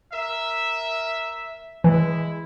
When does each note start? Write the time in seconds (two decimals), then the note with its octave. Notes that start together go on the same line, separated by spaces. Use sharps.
0.13 A#4 E5
1.84 E3 G#3 E4